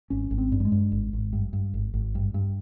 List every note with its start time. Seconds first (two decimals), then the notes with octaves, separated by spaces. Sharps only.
0.10 G#1 C#4
0.31 G#1
0.38 C4
0.52 G2
0.60 G3
0.65 G#3
0.72 G2
0.92 G#1
1.13 G#1
1.33 G2
1.53 G2
1.74 G#1
1.94 G#1
2.15 G2
2.34 G2